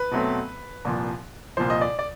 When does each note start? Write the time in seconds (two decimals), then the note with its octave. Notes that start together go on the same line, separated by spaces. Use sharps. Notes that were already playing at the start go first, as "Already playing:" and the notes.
Already playing: B4
0.11 B2 F#3 A3 C4
0.85 C2 A#2 F3
1.57 C2 A#2 F3 C5
1.70 D#5
1.81 D5
1.99 D5